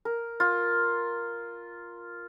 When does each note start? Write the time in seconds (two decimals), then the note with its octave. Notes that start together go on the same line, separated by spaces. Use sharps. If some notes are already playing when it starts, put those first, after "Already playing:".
0.05 A#4
0.40 F4